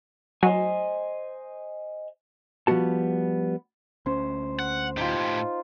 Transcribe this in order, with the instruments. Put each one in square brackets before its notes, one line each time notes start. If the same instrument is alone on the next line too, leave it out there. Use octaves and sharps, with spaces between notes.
[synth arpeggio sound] F#3 [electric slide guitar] C5 D#5 G#5
[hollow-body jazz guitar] F3 G3 B3 F#4 A5
[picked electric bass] D2 C#4 [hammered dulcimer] C5
[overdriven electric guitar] F#5
[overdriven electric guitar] A2 G4 [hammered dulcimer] D#4 F4